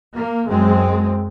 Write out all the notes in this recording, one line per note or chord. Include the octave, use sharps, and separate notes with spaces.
A#3
F#2 F#3 G#3 C4